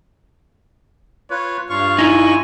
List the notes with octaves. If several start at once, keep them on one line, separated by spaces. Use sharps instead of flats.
F4 B4 C#5
G2 F4 F5 C#6
D#4 E4 G#5